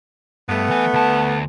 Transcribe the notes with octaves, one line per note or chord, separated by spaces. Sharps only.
G2 A3 B3
E3 G#5
D2 A5